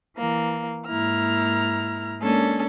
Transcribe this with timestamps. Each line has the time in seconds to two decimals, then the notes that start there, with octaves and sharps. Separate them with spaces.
0.17 E3 A#3
0.88 G#2 A#3 E4 A#5 F6
2.20 G#3 A#3 C#4 D4 A4